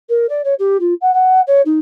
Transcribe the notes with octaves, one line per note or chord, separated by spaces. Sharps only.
A#4
D5
C#5
G4
F4
F#5
F#5
C#5
D#4